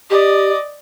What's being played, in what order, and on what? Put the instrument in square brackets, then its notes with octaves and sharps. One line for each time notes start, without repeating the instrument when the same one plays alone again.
[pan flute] G4 [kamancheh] D5 D#5